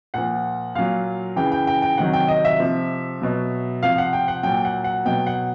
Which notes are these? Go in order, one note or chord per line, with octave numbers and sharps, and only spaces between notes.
A#2 F3 F#5
A#2 F#3 F5
C#3 E3 G5
G5
G5
G5
C3 D#3 F#3 F#5
G5
D#5
E5
C3 F3
B2 F#3
C3 F3 F5
F#5
G5
F#5
A#2 F#3 G5
F#5
F#5
B2 F#3 G5
F#5